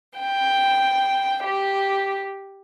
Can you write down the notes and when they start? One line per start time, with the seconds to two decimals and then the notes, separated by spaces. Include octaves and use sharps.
0.18 G5
1.44 G4